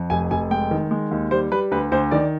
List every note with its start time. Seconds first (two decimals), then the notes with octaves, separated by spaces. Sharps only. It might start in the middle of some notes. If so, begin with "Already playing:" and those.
Already playing: F2
0.10 F1 G#5
0.31 F1 G#5
0.51 G#3 G5
0.71 D#3
0.91 G#3
1.11 D#2
1.31 G3 C5
1.52 G3 B4
1.71 D2 B4
1.92 D2 C5
2.11 D#3 D5